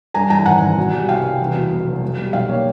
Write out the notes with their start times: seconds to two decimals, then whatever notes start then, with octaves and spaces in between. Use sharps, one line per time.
0.14 G2 G#5 A#5
0.30 E3 G#5 A#5
0.46 G#1 F#5 G#5
0.62 G#1
0.78 B2
0.93 G3
1.08 C2 F5 G5
1.24 C2
1.40 E2
1.56 B2
1.71 F1
1.86 F#3
2.02 B2
2.18 G3
2.33 B1 F5 G5
2.49 A#3 C#5